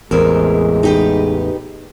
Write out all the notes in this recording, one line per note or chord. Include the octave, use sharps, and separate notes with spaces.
A1 E2 G#3 C4 A#4
D#4 G4 B4